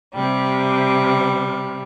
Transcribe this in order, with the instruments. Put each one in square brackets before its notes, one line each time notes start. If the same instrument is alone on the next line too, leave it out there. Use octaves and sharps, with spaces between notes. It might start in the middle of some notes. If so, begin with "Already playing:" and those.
[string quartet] C3 G3